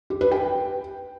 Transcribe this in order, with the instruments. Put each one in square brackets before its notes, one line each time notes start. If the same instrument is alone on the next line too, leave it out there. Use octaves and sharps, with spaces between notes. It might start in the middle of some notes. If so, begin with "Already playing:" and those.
[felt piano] G4
B4
G5